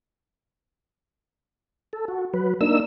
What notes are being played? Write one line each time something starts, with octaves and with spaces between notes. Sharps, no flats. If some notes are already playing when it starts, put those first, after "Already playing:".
A4
F#4
F#3 B4
A#3 D4 D#4 E6